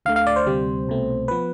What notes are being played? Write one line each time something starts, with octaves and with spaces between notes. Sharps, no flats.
D2 D3 A3 F5
F5
D5
C5
D2 C3 G3 C4
C2 B2 A3 C4
F3 B3 B4